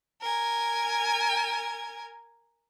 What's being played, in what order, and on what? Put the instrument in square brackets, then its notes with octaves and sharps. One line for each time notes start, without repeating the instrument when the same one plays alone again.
[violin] A#4 G#5